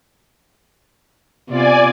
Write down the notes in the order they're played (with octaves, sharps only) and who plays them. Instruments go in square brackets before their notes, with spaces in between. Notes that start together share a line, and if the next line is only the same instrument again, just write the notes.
[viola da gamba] C3 B3 F4 [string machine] D5 G#5